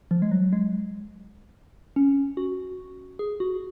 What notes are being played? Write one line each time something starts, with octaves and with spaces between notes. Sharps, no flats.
F3
G#3
F#3
G#3
C#4
F#4
G#4
F#4